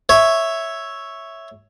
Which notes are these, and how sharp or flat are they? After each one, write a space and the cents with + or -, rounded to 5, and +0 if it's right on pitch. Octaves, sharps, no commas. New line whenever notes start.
C#5 +0 E5 +0